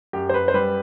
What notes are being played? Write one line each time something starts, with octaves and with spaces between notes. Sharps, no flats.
F#2 G4
C5
B4
C5
G3 B4